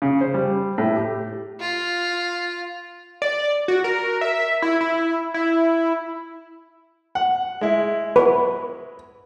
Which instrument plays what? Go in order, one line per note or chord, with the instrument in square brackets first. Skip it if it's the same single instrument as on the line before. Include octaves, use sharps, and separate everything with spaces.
[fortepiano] C#3
C5
G3
A2
G4
[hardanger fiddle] F4
[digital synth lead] D5
F#4
A#4
E5
E4
E4
E4
[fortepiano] F#5
G#3 E4
[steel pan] B4